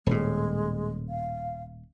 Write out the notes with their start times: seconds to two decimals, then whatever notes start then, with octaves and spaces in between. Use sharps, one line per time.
0.06 D#1 A2 G#3
1.09 F5